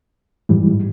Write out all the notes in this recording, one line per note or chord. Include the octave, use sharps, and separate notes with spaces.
G#2 E3 G3